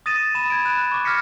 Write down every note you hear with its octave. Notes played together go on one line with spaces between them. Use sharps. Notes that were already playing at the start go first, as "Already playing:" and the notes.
D#6 A6 A#6 D#7 E7
B5 E7
B5 G#6 D7
F#6 E7
C#6 D6
F6 G#6 A#6 B6 C#7